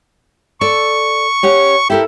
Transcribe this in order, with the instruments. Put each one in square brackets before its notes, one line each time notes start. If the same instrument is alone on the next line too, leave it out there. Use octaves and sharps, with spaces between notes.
[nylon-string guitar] A4 D5 [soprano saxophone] C#6
[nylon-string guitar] C#4 G4 F#5
[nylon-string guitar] E4 A4 A#4 [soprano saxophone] G4